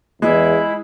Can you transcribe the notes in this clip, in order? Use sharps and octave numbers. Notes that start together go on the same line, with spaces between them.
E2 G#3 E4